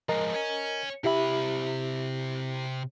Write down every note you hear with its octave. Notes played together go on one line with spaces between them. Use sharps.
F3 G#3 A#4 D#5 A#5
C#5 G#5
C3 E4 G4 E5 B5